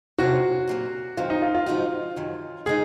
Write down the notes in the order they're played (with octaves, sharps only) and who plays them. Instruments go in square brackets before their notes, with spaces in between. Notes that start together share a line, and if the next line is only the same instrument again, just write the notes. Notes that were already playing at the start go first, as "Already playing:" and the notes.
[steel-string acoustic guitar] F2 C3 F#3 C#4 F4 [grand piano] F#4
[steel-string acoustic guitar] A#2 F#3 A#3
[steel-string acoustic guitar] F#2 D#3 F#3 C4 [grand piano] F4
[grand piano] D#4
F4
F4
[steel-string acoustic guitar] G#2 F3 G#3 D#4 F#4
F#2 D#3 F#3
[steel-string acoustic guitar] C#3 G#3 D#4 [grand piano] G#4